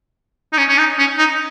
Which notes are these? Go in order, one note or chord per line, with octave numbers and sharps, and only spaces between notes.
D#4
C#4
C#4
D#4
C#4
D#4